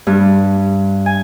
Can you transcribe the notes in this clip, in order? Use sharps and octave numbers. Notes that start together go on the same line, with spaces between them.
G2
G#5